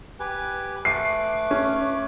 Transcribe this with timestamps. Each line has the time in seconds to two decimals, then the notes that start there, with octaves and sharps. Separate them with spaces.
0.20 G4 B4 G#5
0.85 A3 B4 D6 C7
1.51 C#4